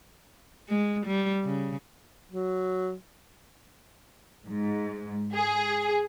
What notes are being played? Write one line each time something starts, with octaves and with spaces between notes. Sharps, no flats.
G#3
G3
C#3
F#3
G#2
G#4